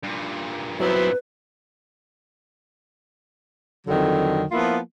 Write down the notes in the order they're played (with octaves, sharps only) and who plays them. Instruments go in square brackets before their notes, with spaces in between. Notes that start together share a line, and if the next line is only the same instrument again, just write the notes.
[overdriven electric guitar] G2 A#2
[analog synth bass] F#3 [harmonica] B3 C4 E4 [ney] B4
[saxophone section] F2 D3 D#3 F#3
F3 A#3 B3 E4 F4